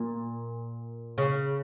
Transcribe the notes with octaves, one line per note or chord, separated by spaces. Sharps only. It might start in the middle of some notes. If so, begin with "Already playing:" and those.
Already playing: A#2
C#3